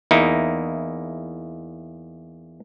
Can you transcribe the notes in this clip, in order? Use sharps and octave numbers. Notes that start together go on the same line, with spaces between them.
E2 A#3 D#4 E4